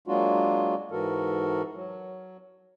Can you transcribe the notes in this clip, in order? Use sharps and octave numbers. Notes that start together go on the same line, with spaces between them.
F#3 G#3 A#3 D4 F4 F#4
G#2 E3 F#4 A4 A#4
F#3